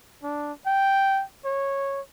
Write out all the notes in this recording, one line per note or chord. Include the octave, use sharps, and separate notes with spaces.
D4
G5
C#5